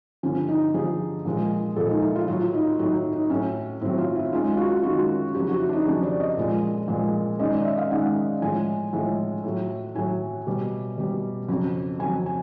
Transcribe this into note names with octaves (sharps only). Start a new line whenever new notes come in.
G2 D3 F3 C#4
D#4
G2 D3 F3 G#4
A#2 F3 G#3
A#2 F3 G#3 A4
D#4
E4
F4
A2 F#3 F4
D#4
A2 F#3 D#4
D#4
D#4
A2 F#3 C#4
A2 F#3 C4
F4
E4
F#2 D#3 G#3 F4
F4
F#4
F#2 D#3 G#3 F#4
F2 C#3 F#3 G4
F#4
E4
D4
D#4
F2 C#3 F#3 G#4
D5
D#5
A#2 F3 G#3
A#2 F3 G#3
F#2 D#3 G#3 D#5
D5
E5
F5
F#2 D#3 G#3 F#5
A2 F3 G#3 G#5
A2 F3 G#3
A2 F#3
A2 F#3 G#5
B2 G3
B2 G3
F2 C#3 F#3
F2 C#3 F#3 G#5
G#5